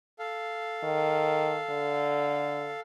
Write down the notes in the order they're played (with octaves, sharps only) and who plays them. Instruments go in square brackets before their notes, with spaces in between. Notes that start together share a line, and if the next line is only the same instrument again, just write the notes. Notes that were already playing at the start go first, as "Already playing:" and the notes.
[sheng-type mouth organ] A4 F5
[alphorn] D#3
D3